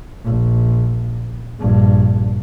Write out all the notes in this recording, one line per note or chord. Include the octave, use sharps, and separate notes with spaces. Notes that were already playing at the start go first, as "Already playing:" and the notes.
A#1
A#1 G2